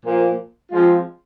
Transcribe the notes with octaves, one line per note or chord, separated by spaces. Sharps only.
A#2 F3 A#3
F3 G#3 C4 F4